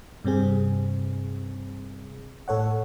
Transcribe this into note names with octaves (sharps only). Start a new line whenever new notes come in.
G2 C3 C4 G#4
A2 A4 C#5 F#5